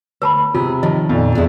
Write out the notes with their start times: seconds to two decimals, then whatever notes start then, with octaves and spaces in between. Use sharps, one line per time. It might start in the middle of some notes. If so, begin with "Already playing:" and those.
0.22 D2 B4 A5 B5
0.54 C3 F4 G#4
0.83 D#3 F3 D#5 A5
1.09 F2 A#2
1.35 E2 D4 E4